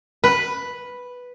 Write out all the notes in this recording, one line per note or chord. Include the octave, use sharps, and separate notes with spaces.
B4